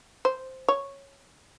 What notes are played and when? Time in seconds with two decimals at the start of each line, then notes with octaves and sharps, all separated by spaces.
0.25 C5
0.68 C#5